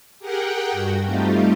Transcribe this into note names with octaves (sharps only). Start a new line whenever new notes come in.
G4 G#4 A#4 F#5 G5
G2 F#4
G3 A3 C4 D#4 F4 G4